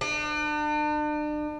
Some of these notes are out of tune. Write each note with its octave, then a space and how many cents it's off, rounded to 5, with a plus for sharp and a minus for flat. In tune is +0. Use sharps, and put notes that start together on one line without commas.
D4 +40